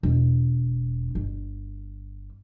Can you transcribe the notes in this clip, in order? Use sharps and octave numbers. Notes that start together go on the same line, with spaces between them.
E1
G1